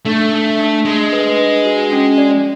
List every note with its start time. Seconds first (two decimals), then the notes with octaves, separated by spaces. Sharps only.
0.05 A3 D4
0.32 D4
0.59 D4
0.85 G#3 D4
1.12 B4
1.39 D4
1.65 F#4
1.92 C#4
2.18 D5